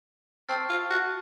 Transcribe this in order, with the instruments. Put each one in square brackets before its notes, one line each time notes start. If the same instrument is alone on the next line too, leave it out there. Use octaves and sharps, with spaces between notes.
[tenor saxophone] C4 [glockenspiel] A5 C#6 F6 A6 C7
[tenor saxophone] F4
F#4